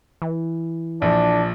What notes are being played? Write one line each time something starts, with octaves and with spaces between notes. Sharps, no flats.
E3
A#1 F3 D4